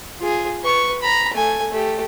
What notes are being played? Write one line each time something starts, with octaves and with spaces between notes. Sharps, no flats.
F4 G#4
B4 C#6
A#5 B5
A3 G#5
A3 G4